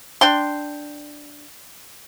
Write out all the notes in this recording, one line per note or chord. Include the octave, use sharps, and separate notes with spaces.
D4 G5 C6